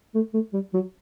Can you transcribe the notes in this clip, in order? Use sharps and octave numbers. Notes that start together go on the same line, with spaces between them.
A3
A3
G3
F#3